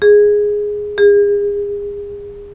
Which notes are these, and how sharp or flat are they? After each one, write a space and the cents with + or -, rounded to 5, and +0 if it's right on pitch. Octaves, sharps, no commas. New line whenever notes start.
G#4 +0
G#4 -35